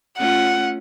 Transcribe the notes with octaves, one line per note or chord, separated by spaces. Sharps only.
A3 C#4 F4 F#5